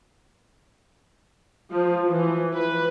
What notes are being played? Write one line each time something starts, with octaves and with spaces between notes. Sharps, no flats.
F3
E3
B4